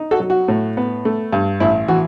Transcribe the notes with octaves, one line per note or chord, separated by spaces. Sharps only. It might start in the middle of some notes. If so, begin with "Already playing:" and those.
Already playing: D#4
F#4 A4
F#3
F#4
A2
B3
A3
G2
A1 E4
E3 F#4